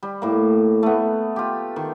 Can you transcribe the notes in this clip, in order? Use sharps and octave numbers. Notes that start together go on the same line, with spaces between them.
G3
A2 A#3
A3 B3
F4 G4
D#3